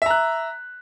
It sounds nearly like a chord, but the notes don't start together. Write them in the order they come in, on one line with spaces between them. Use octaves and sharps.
E5 A#5 F#6